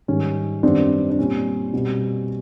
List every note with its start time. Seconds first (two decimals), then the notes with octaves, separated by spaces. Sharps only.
0.08 G#2 D#3 G3 C#4
0.63 F#2 D#3 G3 B3 C4 D4
1.10 D4
1.19 A#2 G3 C4 C#4
1.74 B2 G3 C4